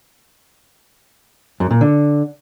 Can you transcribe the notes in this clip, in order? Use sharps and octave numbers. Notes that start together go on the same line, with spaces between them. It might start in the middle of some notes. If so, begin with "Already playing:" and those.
F#2
A#2
D3